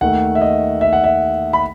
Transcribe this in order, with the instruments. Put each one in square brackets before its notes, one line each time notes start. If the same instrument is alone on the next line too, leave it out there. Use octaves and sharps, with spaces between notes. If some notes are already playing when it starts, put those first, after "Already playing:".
[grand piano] D#2 D#3 A3 F#5
E5
D#5
E5
F#5
E5
B5